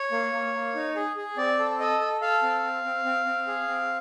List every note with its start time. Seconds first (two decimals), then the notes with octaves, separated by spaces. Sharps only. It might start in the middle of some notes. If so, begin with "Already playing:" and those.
Already playing: C#5
0.12 A#3
0.33 A#3
0.54 A#3
0.75 D#4
0.96 G#4
1.16 G#4
1.37 C4 D5
1.59 A4
1.79 A4 D#5
2.00 A4
2.21 A4 F5
2.43 C4
2.63 C4
2.84 C4
3.05 C4
3.26 C4
3.47 G#4
3.68 C4